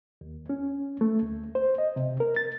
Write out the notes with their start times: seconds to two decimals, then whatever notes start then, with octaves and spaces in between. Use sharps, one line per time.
0.21 D#2
0.50 C#4
1.01 A3
1.22 D2
1.55 C5
1.78 D#5
1.96 C3
2.20 A#4
2.36 A6